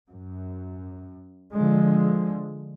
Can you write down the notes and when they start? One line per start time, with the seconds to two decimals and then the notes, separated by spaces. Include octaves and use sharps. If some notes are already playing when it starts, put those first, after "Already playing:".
0.10 F#2
1.55 D3 F3 G#3